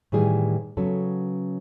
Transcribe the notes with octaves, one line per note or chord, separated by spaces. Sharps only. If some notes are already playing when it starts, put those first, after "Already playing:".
A2 D#3 E3 G3 G#4
C#3 F#3 B3 C#4 A4